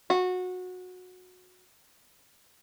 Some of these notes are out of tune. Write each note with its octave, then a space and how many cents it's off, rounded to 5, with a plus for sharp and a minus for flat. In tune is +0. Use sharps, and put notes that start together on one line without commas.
F#4 -20